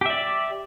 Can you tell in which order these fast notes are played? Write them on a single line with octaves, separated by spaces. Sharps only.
G4 E5 D5